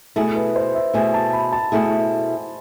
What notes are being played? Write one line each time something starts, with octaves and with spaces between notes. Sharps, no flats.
B2 A3 E4 G#4 A4
B4
C5
E5
B2 A3 E4 G#4 G#5
A5
B5
A5
B2 A3 E4 G#4